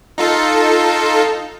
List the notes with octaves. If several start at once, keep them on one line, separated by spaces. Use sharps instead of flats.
D#4 F4 A4